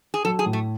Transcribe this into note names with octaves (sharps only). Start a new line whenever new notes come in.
G#4
F#3 A4
G#4
A2
A3